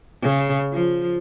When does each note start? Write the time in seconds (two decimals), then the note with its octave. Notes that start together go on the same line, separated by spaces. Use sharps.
0.22 C#3
0.72 F3